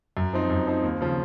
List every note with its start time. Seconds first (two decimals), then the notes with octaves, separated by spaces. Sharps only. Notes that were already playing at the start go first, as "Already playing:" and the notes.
0.17 F#2
0.33 F3 C4 D#4
0.50 F#2
0.67 F3 C4 D#4
0.83 D#2
1.01 C#3 F3